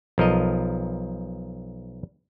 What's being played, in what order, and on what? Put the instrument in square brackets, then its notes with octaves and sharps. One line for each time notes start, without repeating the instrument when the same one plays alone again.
[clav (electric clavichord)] B1 F3 A#4 D#5